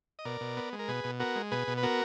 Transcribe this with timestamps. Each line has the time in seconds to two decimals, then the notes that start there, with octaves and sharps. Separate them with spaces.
0.19 D#5
0.25 B2 A#4 D5
0.41 B2
0.57 B3
0.73 G#3
0.79 A#4
0.88 B2 G#4 B4
1.04 B2
1.20 B3 F#4 A#4
1.36 G#3
1.52 B2 G#4 B4
1.67 B2
1.78 B4
1.83 B3 F#4 A#4